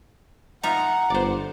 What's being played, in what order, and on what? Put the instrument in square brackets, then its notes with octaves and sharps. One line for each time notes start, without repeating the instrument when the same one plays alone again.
[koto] D#4 F4 E5 [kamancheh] F#5 [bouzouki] A#5
[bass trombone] G1 [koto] C5 D5